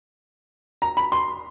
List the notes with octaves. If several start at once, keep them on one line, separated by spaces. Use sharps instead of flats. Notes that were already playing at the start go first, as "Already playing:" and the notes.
A#5
B5
C6